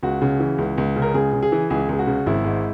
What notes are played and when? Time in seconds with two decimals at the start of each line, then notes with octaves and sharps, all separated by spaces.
0.03 C#2 F#4
0.22 C#3
0.40 E3
0.58 C#2
0.78 C#2
0.96 C#3
1.02 A#4
1.14 C#2 G#4
1.33 C#3
1.42 G#4
1.52 E3
1.70 C#2 G#4
1.89 C#2 G#4
1.99 F#4
2.07 C#3
2.26 G#1 E4
2.44 G#2